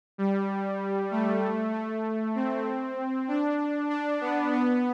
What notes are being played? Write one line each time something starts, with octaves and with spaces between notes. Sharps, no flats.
G3
A3
A3
C4
D4
D4
B3
B3